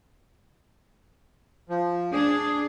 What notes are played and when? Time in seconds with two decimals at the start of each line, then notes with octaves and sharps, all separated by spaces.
1.69 F3
2.13 D4 G#4